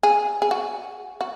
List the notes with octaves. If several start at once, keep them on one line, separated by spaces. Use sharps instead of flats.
G#4
G#4
F#4
F#4